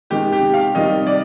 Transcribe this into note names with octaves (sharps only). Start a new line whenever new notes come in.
C3 D#3 G#3 G4
G4
F5
C3 D#3 G3 D#5
D5